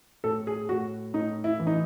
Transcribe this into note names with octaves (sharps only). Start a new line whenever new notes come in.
A2 A4
G#4
A2 F#4
A2 D#4
E4
E3
D#4